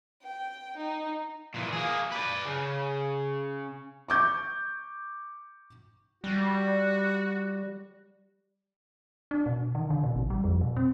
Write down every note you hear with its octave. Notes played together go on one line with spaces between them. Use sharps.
G5
D#4
A#2 E3
A#3 G#4
B4 D5
C#3
C#6 D6 G6
G3 F#4
D4
B2
D#3
D3
B2
A1
G3
F2
B2
C4